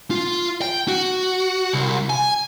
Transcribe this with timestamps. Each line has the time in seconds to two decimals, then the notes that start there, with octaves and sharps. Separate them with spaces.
0.11 F4
0.62 G5
0.88 F#4
1.73 C2
2.10 G#5